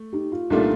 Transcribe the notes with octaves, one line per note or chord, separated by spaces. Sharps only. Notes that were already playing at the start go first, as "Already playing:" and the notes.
Already playing: A3
D#4 G4
F4
C2 A#2 A3 D4 D#4 F4